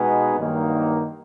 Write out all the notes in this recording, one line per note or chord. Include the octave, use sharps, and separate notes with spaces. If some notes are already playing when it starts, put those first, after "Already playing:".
Already playing: B2 G#3 B3 D#4 G#4
G2 D#3 F#3 A#3 D#4